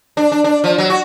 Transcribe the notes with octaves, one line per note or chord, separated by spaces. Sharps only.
D4
D4
D4
F3
F#3
F#4